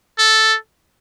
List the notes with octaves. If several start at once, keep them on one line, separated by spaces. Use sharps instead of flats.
A4